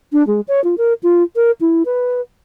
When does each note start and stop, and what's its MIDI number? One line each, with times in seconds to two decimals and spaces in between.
0.13 0.25 62
0.27 0.41 56
0.48 0.63 73
0.64 0.75 65
0.78 0.93 70
1.03 1.23 65
1.36 1.51 70
1.61 1.83 64
1.85 2.21 71